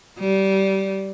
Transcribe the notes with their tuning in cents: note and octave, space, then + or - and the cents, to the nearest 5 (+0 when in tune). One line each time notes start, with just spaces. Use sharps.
G3 -20